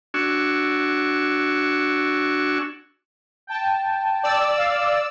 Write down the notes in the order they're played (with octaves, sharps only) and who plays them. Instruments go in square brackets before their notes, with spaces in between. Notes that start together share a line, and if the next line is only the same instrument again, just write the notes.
[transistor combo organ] D4 F#4 G#5 C#6 E6
[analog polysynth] G5 A5
[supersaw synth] D5 E6
[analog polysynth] F5